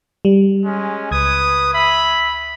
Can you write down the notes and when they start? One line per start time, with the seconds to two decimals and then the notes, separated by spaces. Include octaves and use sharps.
0.25 G3
0.64 G#3 C#4
1.11 C#2 B4 D#6 G#6
1.73 E5 B5